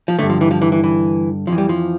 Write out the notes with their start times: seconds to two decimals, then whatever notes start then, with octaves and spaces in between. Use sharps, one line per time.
0.08 F3
0.19 G2 D3 A3
0.30 F3
0.41 E3
0.51 F3
0.62 E3
0.72 E3
0.84 E3
1.47 F2 E3 F3
1.58 G3
1.69 F3